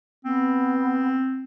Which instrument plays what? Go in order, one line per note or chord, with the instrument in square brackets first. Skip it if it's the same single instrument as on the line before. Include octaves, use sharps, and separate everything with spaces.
[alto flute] B3 [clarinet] C4